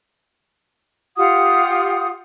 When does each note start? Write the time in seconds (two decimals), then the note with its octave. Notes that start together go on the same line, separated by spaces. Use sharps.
1.16 F4 G4 F#5 D#6